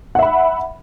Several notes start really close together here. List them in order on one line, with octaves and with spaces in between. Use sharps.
F#5 E5 B5